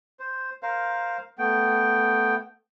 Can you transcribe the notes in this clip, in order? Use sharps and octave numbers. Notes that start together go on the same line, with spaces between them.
C5
A#4 C5 F5
A3 B3 G5